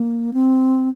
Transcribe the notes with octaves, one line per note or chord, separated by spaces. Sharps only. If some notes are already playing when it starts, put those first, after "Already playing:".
Already playing: A#3
C4